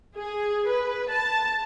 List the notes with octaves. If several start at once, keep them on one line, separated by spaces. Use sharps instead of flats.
G#4
B4
A5